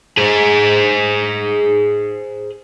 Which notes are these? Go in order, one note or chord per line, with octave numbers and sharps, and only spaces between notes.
G#4 C5